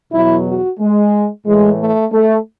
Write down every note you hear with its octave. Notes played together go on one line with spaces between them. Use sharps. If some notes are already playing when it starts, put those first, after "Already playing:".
E2 B2 F#3 E4
F#4
G#3
A2 E3 G#3
A3
A3